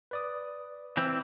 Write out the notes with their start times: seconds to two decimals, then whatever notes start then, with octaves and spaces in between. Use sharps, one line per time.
0.11 B4 D5 D#6
0.97 E3 C4